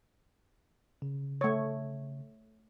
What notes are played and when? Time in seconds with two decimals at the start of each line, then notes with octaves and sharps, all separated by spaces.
1.02 C#3
1.41 A3 C#5